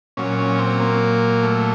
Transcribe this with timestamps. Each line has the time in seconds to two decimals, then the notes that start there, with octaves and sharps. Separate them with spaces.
0.17 A#2 F#3 C#4
0.39 C#4
0.59 C4
0.80 A#3
1.43 A3